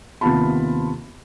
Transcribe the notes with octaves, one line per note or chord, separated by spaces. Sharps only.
D#2 C3 B3 F4 A5 B5